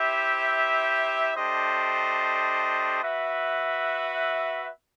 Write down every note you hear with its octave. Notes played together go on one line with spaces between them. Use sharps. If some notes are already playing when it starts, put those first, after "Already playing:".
Already playing: E4 G4 C5 E5
A3 D4 G4 C5 D#5
F#4 B4 E5